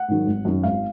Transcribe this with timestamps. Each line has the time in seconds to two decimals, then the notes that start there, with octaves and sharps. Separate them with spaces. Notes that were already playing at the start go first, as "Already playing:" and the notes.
Already playing: F#5
0.08 G#2 D#3 F#3
0.27 G#1
0.45 F#2 D#3 F#3
0.64 G#1 F5